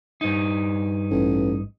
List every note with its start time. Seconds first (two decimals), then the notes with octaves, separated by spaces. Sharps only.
0.21 G2 D#4
1.10 A1